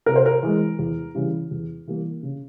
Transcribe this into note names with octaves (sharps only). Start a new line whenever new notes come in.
C3 A#4
C5
A#4
E3 G#3
E2
C#3 E3 G3
E2
E3 G3 A#3
C#3